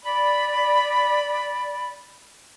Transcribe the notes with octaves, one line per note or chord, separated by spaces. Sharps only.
D5 B5